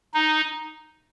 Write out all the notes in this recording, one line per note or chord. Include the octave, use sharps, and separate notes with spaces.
D#4